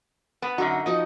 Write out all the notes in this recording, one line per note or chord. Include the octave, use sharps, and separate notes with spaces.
B3
F#2 D3 D#4 F#4
F3 D#4 F#4 D#5